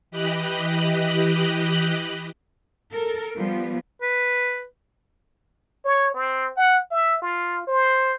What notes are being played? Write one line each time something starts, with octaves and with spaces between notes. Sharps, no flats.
E3 G4 D#5 B5 F#6
A4 A#4
F3 G3 B3
B4
C#5
C4
F#5
E5
F4
C5